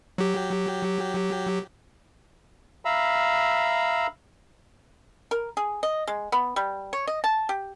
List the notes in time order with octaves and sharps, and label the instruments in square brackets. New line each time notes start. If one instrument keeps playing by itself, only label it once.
[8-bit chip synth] F#3 G4
[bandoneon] E5 F5 A#5 B5 E6
[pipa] A#4
G#4
D#5
G#3
B3
G3
C#5
D#5
A5
G4